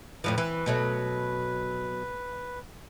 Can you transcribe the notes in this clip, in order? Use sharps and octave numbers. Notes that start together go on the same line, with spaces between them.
F2 A2 F3 B4
E3
B2 F#3 A3